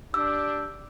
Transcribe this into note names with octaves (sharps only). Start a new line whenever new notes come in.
D4 G4 E6